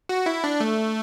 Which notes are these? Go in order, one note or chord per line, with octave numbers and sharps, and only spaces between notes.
F#4
E4
D4
A3